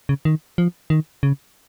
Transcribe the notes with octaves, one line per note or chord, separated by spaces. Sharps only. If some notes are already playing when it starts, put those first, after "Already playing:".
C#3
D#3
F3
D#3
C#3